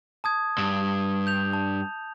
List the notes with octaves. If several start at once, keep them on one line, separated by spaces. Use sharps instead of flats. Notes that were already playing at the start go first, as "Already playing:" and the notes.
A5 D#6 G#6
G2
G6 F7
A5